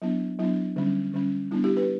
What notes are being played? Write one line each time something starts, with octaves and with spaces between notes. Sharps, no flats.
F#3 B3 D4 E4
F#3 B3 D4 E4
D3 G3 C#4
D3 G3 C#4
G3 B3 D4 E4
E4 G4
G4 B4